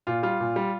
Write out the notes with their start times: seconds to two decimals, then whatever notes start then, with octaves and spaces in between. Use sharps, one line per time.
0.07 A#2 F4
0.23 G3 F4
0.40 A#2
0.56 G3